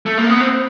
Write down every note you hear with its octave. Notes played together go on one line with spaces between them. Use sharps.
A3
A#3
B3
C4